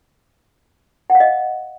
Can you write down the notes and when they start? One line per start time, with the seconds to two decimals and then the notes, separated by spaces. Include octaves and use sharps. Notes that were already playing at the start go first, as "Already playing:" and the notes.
1.10 F#5
1.15 F5
1.20 D#5